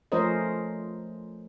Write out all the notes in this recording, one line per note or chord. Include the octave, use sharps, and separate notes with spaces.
F3 A3 C#4 A#4 C5 D#5